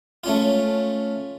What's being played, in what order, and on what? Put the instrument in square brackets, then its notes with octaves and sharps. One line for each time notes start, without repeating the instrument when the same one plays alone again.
[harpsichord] A3 C#4 F4